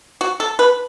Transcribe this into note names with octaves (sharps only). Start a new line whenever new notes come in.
F#4
A4
B4